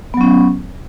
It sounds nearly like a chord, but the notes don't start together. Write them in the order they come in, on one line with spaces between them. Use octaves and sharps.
B3 F#3 C#4